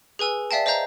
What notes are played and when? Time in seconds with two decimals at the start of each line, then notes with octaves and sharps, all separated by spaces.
0.19 G#4 B4 G#5 E6
0.51 D5 E5 F5 G5 A5
0.66 C5 D#5 F5 A#5 G6